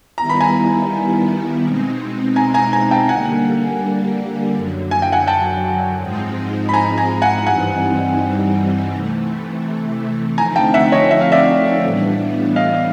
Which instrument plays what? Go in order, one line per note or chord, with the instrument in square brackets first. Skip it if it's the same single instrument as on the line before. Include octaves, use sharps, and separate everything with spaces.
[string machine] D#3 G3 B3 E4 [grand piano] A#5
[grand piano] B5
G#5 A#5
[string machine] B2 G#3 C4 D#4
[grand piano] G#5 A#5
G#5 A#5
G#5 A#5
G5 A5
[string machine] D3 G3 A#3 [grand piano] F#5 G#5
[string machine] F#2 D3 F#3
[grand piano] G#5
G5
F#5 G#5
G5 A5
[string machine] G#2 F3 G#3 C4 D#4
[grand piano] B5
G#5 A#5
G#5 A#5
F#5 G#5
[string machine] G2 E3 G3 C4 D#4 [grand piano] F#5 G#5
[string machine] C3 E3 A3
[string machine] D3 F3 A3 C4 D#4 [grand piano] G#5 A#5
[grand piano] G5 A5
E5 F#5
C#5 D#5
E5
F5
D5 E5
[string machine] A2 E3 G3 B3 D4
[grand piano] D#5 F5